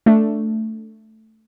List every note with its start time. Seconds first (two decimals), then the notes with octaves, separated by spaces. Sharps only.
0.06 A3 D4